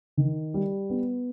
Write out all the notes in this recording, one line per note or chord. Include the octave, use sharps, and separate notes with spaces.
D#3
G3
B3